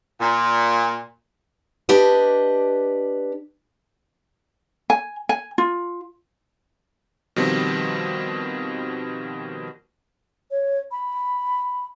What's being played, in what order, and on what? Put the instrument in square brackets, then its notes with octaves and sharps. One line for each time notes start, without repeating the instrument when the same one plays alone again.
[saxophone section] A#2
[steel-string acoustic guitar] D4 G4 B4 D#5
[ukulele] G#5
G#5
F4
[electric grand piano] B2 D#3 F3 G3 C4
[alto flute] C#5
B5